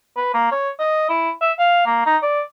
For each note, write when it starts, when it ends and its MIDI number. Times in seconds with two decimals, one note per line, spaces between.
0.17 0.30 71
0.34 0.47 58
0.52 0.70 73
0.79 1.07 75
1.09 1.30 64
1.41 1.52 76
1.59 1.83 77
1.86 2.05 58
2.06 2.17 63
2.23 2.41 74